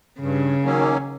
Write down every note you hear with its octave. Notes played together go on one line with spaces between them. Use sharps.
G2 C#3
D#3 F#3 A#3 C#4